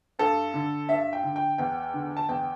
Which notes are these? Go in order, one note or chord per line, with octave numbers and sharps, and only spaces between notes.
G2 A4
D3
G2 E5
G5
D3
G5
E2 G5
D3
A5
E2 G5